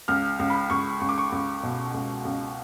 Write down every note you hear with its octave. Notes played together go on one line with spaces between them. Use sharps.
C#2 F6
C#2
B5
C#2 C#6
C#2 C#6
D6
C#6
C#2
B2
C#2
C#2